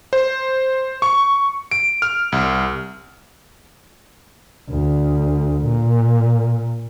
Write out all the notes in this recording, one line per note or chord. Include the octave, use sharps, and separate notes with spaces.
C5
C#6
D7
F6
C2
D2
A#2